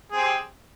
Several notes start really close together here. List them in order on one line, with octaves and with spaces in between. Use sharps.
G#4 C4 G4